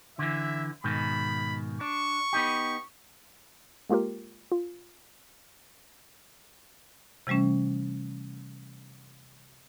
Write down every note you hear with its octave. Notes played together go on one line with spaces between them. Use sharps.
D3 E3 E5
G#2 B2 D#3 B5
D4 C#6
B3 D#4 G4
G#3 A#3 F4 G4 A#4
F4
C3 E3 G3 A3 C#4